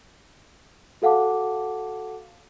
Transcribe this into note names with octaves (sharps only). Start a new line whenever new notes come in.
F#4 A4 F5 F#5 A5 D6